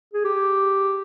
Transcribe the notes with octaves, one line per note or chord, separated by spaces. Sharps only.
G#4
G4